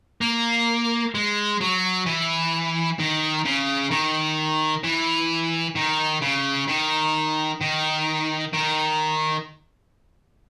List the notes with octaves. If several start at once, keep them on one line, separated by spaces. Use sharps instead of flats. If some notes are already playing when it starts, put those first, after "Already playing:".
A#3
G#3
F#3
E3
D#3
C#3
D#3
E3
D#3
C#3
D#3
D#3
D#3